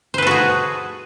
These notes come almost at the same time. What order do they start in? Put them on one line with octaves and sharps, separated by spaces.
C5 B4 A4 F#4 G#4